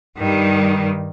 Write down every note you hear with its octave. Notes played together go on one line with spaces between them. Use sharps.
G2 D#3 G3